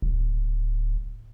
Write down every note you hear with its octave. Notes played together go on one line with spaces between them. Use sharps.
D1